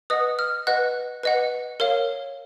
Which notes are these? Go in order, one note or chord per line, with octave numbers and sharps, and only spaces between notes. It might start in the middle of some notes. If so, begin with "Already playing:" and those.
B4 D#5 F#5 D#6
F6
B4 D#5 F#5 F#6
B4 D#5 F#5
A#4 C#5 F5